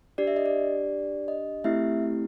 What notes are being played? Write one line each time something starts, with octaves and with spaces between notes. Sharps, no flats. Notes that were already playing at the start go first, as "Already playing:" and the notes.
D4 G4 D5
E5
D#5
D5
D#5
A3 C4 E4 G4 E5